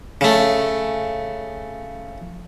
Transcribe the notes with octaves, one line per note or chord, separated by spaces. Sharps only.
C#3 A3